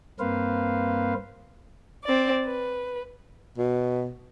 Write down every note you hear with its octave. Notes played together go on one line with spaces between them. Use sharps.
G2 A#3 C4 B4 C5 F5
C4 D5
B4
B2